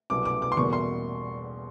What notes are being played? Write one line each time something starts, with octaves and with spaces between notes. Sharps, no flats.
C2 B2 F#3 B3 D6
D6
D6
C6
E2 B2 G3 A#3 C#6
C6